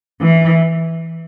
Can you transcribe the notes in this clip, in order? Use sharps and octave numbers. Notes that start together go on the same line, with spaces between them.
E3